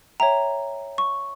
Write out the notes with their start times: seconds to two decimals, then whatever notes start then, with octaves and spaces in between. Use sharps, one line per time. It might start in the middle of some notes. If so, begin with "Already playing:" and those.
0.20 C#5 E5 G5 A#5
0.98 C#6